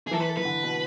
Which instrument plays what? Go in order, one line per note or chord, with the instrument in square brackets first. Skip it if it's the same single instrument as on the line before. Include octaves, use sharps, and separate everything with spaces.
[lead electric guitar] G#4
[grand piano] E3 [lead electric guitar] A4
[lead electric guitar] B4
A4
[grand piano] E3 [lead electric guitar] B4
[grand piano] D3
B2